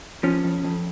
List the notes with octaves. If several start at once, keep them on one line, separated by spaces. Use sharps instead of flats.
F3 C#4
F2
F2